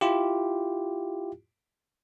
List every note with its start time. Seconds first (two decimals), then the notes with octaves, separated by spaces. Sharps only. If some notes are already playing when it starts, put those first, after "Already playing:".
0.01 E4 F4 G4